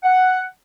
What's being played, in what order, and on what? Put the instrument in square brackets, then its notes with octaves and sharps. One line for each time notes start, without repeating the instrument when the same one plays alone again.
[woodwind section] F#5